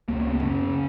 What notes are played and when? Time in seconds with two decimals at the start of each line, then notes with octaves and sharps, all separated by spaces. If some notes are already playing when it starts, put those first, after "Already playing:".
0.09 C#2 C#3 A#3
0.20 A#3
0.31 B3
0.41 F#2 C#3 C#4